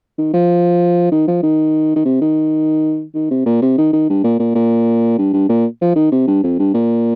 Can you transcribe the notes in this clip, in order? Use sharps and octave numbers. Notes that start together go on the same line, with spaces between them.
D#3
F3
D#3
F3
D#3
D#3
C3
D#3
D#3
C3
A#2
C3
D#3
D#3
G2
A#2
A#2
A#2
G2
G2
A#2
F3
D#3
C3
G2
F2
G2
A#2